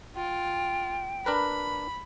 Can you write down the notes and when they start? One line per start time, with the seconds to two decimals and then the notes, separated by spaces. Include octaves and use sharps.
0.16 F4 G5
1.26 D4 A#4 B4 B5